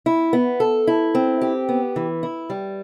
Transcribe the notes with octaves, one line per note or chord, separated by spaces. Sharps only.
E4
B3
A4
E4
C4
G4
B3
E3
E4
G3